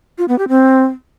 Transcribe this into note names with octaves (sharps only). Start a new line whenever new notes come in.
F4
B3
G4
C4